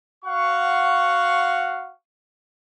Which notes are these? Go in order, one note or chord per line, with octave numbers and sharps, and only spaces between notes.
F#4 F5 F#5 C#6